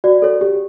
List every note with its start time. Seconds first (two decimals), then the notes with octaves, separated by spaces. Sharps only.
0.04 F#4 D5
0.22 A4 C#5
0.41 G4